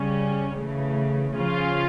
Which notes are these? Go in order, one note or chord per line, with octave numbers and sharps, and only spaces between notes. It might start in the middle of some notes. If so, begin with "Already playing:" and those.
Already playing: C#3 G3 C#4
C#3 E3 A3
C#3 F3 C#4 F4